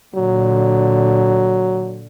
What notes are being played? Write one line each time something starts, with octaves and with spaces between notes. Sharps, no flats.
A#2 D3 F#3